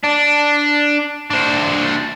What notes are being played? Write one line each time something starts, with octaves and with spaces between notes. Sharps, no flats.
D4
D4 C5